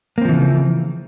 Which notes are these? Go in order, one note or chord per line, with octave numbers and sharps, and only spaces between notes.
C#3 E3 F3 A#3 C4